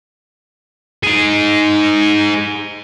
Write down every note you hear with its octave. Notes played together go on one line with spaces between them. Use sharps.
D#4 G#4